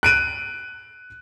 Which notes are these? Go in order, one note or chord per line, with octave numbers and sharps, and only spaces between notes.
F#6 D7 D#7